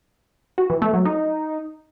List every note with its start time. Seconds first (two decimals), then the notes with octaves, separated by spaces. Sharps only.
0.58 F#4
0.70 E3
0.82 A3
0.94 F#3
1.05 D#4